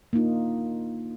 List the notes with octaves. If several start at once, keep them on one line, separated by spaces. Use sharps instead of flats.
A#3 D4 D#4 F4